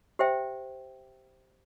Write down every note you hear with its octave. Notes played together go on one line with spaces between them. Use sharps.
G4 C5 E5 G5